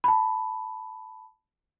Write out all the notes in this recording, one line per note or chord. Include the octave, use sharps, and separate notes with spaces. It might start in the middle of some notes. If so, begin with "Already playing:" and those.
A5 B5